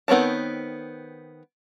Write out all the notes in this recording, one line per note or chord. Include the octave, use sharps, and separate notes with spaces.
D#3 B3 C4 C#5 A5